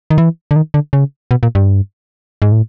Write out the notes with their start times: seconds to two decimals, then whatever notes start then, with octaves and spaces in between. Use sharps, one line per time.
0.10 D#3
0.18 E3
0.51 D3
0.56 D#3
0.74 D3
0.93 C#3
1.31 B2
1.43 A#2
1.55 G2
2.42 G#2
2.52 A2